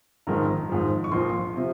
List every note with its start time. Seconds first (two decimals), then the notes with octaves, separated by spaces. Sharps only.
0.27 A#1 G#2 D#3 A#5
0.69 G#1 G#2 F3
1.04 C#6
1.12 A#1 A#2 F3 C6
1.56 C3 F3